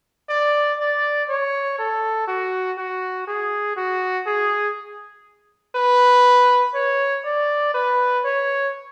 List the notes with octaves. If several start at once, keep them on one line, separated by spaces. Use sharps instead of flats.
D5
D5
C#5
A4
F#4
F#4
G#4
F#4
G#4
B4
C#5
D5
B4
C#5